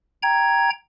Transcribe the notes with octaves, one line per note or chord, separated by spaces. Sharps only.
G5 A#5 G#6